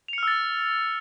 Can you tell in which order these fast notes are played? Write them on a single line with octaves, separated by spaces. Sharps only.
F7 C#7 F6 E6 A6